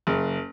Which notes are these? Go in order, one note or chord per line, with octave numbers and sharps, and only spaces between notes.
F#1